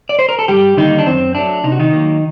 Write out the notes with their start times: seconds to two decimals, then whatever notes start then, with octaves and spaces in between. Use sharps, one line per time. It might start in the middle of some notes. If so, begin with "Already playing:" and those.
0.09 D5
0.19 C5
0.29 A#4
0.39 A4
0.48 G2 G3 G4
0.77 D3 D#3 G3 A#3 D#4
0.99 D4
1.06 F#2 C4
1.35 F#3 A3 D4
1.64 C3 D#4
1.72 F#4
1.79 D#3 D#4
1.93 F#3 A#3